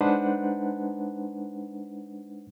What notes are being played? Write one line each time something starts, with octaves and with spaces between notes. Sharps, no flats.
G#3 D4 D#4 B4 C5 F#5